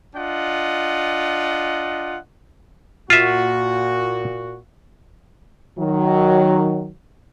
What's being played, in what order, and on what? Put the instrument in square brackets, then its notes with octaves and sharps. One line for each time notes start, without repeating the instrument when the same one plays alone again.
[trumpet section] D4 F4 D#5 F#5
[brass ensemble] A#2 F#4 [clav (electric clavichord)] F4 E5
[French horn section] D#3 F#3